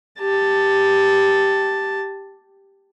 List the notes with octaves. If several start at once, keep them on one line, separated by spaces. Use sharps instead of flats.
G4 A5